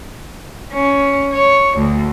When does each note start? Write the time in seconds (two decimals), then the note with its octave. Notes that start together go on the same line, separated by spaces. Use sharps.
0.74 C#4
1.34 C#5
1.78 D2